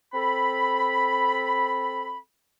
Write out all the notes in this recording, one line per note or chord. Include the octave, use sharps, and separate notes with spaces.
C4 A4 B5